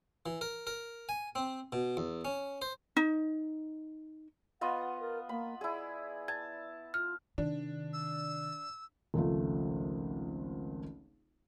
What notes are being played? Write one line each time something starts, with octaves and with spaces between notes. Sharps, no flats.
E3
A#4
A#4
G#5
C4
B2
E2
C#4
C5
D#4
B3 F4 D#5 F#5
A#4
A#3 B5
E4 G#4 D5
A5 G#6
F4 F6
C3 D#3 D4
E6
G#1 C#2 F3 A3